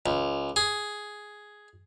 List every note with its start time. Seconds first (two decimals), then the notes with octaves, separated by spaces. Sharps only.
0.06 C#2
0.56 G#4